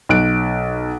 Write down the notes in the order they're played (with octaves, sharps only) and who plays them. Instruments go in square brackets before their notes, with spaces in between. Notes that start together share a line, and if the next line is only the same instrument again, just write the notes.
[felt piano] B1 F#6 D7